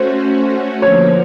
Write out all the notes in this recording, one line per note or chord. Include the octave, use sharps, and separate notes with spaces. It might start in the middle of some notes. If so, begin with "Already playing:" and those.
Already playing: A3 C#4 F#4 C5
D3 F3 A#3 C#5